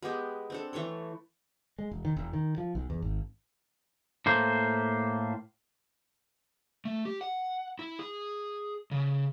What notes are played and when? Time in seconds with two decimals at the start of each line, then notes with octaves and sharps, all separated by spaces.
0.03 G#3 B3 G4 G#4
0.50 C4 D4 A4
0.73 E3 A3 C#5 C6
1.78 G#3
1.91 E1
2.05 D#3
2.17 E1
2.33 D#3
2.58 F3
2.75 B1
2.90 E2
3.02 G#1
4.26 A2 A#3 C5
6.85 A3
7.05 G4
7.21 F#5
7.79 E4
7.99 G#4
8.91 C#3